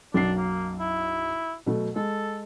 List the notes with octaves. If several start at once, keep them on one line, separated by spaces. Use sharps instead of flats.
B1 F#2 D4 C7
A#3
E4
B2 F#3 A3
G#3 A4